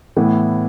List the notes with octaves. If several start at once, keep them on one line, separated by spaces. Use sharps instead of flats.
A2 E3 B3